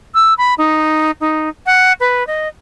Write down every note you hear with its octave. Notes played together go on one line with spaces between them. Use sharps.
E6
B5
D#4
D#4
F#5
B4
D#5